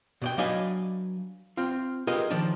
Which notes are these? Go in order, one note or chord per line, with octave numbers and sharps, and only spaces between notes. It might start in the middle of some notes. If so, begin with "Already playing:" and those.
B2 D5 G5
F#3 D4 B4 D#5 F5 G#5
C4 F4
F4 G4 G#4 A#4 B4 D#5
D#3 F3 D4